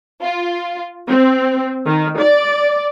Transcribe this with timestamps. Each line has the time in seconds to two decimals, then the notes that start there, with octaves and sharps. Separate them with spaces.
0.21 F4
1.08 C4
1.86 D#3
2.19 D5